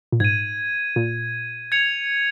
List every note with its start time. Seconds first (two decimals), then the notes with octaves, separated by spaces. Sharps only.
0.12 A#2
0.20 G#2 G#6 D#7
0.96 A#2
1.72 G#6 C#7 F7